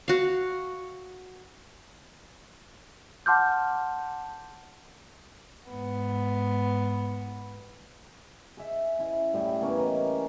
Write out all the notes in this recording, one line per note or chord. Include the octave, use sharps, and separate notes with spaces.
F#4 F5
F#5 A5 C6 D6 F6 G6
G#2 B3
G#4 E5
C#4 E4
A2 G3
A#3 B3 C#4 A#4
E3 D#5 A#5